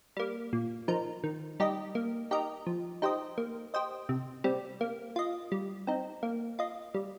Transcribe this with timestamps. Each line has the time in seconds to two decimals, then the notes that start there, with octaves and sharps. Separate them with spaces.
0.17 G3 A#3
0.53 A#2
0.88 F3 D#4 A#4
1.24 D#3
1.60 G3 D#4 G4 D#5
1.95 A#3
2.31 D#4 G4 A#4 D#5
2.67 F3
3.02 D#4 G4 C5 D#5
3.38 A#3
3.74 G4 C5 D#5
4.09 C3
4.44 G3 C4
4.81 A#3
5.16 F4 D#5
5.52 G3
5.87 C4 D#4
6.23 A#3
6.59 F4 D#5
6.94 G3